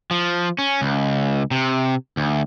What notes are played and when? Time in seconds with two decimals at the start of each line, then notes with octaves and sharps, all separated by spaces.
0.11 F3
0.58 C#4
0.82 C#2
1.51 C3
2.17 D2